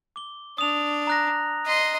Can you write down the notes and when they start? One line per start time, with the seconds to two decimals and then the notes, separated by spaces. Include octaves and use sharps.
0.16 D6 G7
0.58 D4 D#6 F7
1.07 A#5 F#6 A#6
1.66 D#5 C6